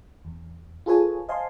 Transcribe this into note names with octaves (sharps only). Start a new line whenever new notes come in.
E2
F4 G#4 A4 B4 C#5 G#5
C5 D#5 F5 G#5 A5 C6